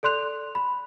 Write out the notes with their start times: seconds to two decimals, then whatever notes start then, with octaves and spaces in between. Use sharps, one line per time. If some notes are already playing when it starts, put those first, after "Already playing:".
0.03 A4 D5 C6 F#6 F7
0.55 B5